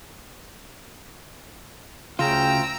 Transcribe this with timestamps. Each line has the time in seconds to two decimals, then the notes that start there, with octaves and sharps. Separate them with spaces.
2.19 D2 C#3 F4 G5 A#5 E6